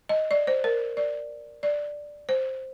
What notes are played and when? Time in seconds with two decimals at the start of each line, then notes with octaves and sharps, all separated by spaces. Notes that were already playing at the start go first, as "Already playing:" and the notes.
0.09 D#5
0.31 D5
0.47 C5
0.64 A#4
0.97 D5
1.63 D5
2.29 C5